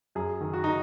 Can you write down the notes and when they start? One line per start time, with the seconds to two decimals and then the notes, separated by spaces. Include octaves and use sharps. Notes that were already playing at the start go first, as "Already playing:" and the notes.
0.15 F#2 G#4
0.41 D#3
0.53 F#4
0.64 D#3 D#4